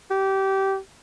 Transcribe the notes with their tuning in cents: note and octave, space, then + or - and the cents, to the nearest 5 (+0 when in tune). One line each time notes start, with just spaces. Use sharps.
G4 -20